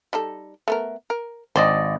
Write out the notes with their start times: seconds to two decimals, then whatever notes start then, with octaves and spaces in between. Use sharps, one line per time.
0.13 G3 D#4 A4
0.68 A3 B3 A#4
1.10 A#4
1.56 G#1 D4 C5 D5 D#5